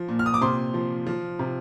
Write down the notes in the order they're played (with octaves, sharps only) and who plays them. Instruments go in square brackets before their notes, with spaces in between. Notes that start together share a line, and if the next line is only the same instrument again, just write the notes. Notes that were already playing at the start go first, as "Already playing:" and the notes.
Already playing: [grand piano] F3
A#2
F6
D#6
D6
C3 C6
F3
F3
C3